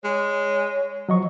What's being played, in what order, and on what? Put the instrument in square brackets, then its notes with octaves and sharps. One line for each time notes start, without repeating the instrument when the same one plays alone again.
[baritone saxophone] G#3 [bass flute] C#5
[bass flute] F3 [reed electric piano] F#3 D#5 C#6